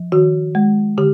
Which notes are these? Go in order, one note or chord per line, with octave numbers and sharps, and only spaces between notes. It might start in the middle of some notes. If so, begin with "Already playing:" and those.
Already playing: F3
D#3 F#4
G#3
D3 G4